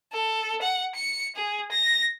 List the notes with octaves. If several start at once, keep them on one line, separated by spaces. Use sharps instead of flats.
A4
F#5
C#7
G#4
A#6